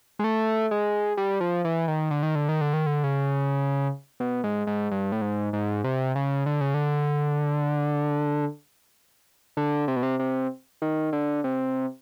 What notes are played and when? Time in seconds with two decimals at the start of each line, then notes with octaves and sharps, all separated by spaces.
0.19 G#3
0.24 A3
0.71 G#3
1.17 G3
1.40 F3
1.65 E3
1.88 D#3
2.11 D3
2.23 D#3
2.35 D3
2.49 D#3
2.61 D3
2.73 D#3
2.86 D3
3.04 C#3
4.20 B2
4.44 G#2
4.67 G#2
4.91 G2
5.12 A2
5.22 G#2
5.53 G#2
5.84 C3
6.16 C#3
6.46 D3
6.61 C#3
6.74 D3
9.57 D3
9.88 C3
9.96 B2
10.03 C3
10.19 C3
10.82 D#3
11.13 D3
11.44 C3